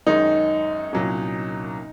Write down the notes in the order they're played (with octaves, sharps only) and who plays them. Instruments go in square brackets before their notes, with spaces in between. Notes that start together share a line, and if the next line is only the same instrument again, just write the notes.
[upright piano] F#2 D#3 G#3 C#4 [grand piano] D#4
[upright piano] C2 A#2 F#3 A#3 C#4